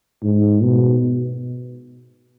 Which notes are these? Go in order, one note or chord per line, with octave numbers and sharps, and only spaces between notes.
G#2
B2